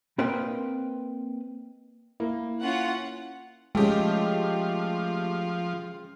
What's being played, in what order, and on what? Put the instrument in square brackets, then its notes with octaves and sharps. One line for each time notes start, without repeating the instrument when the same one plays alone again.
[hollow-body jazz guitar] A#3 C4 A#4 B4 D#5 G5
[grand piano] A#3 [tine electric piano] E4
[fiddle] C#4 F4 [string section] F#5
[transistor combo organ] F3 [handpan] G#3 [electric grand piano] A3 G4 [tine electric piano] C#4 G#4 G5